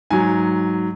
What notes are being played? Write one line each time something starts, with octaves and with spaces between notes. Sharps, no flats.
G#2 F#3 G#5